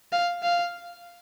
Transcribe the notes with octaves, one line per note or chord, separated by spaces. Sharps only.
F5
F5